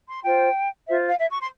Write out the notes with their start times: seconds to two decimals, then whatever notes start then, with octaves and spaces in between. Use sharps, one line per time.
0.08 C6
0.24 F4 C5 G5
0.87 F4 C5 E5
1.09 F5
1.19 E5
1.30 C#6
1.40 C6